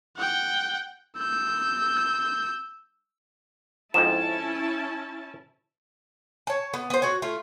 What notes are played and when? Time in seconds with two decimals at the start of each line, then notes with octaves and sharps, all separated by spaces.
0.17 F#5 G5
1.19 E6 G6
3.94 F2 G#2 F3 C#4 E4 A5 E7
6.47 C#5 A5
6.74 B3
6.90 B3 C5
7.02 F#4 C#5
7.22 A3 F4